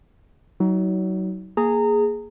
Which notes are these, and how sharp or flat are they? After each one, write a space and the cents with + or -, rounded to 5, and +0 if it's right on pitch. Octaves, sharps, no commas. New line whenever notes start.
F#3 +25 D#4 +40
A#3 +0 G#4 +0 A#5 -25